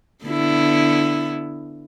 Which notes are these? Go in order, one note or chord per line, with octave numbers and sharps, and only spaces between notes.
D3 B3 E4